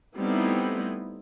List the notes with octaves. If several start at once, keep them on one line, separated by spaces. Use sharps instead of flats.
G3 A3 B3 C4 D#4 E4